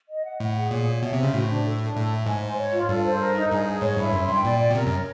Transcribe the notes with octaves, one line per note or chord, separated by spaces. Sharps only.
D#5
F#5
A2 F#5
G#4
A#2 C#5
C#5
B2 E5
C3
C5
C#3
A2 F#4
D4
A4
D4
A2 A4
E5
G#2 G#5
C5
C#5
F4
G2 A4
C5
A#4
D#4
G2 G#4
G#4
G#2 C#5
G2 E4
F#2 C6
G2 G5
A#2 D5
D5
B2
C3 A#4
F#2
C#5